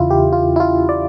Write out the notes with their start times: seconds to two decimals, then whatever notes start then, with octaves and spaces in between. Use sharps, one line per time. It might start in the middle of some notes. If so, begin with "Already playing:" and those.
Already playing: E2 C#3 E3 E4 F4
0.10 G4
0.32 F4
0.56 E4
0.60 F4
0.89 D5